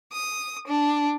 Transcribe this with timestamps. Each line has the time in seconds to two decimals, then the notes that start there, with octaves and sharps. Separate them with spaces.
0.12 D#6
0.67 D4